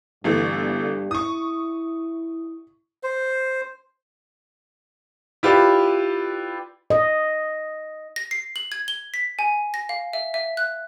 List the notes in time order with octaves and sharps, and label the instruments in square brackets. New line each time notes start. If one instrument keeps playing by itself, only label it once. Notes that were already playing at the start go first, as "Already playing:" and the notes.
[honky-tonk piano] G1 E3 A3 [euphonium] G2
[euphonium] E4 [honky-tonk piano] C#6 D#6
[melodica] C5
[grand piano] E4 F4 G4 B4 D5
[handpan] D#5
[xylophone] A#6
C7
F#7
G#6
G7
B6
G#5
A#6
F5
E5
E5
F#6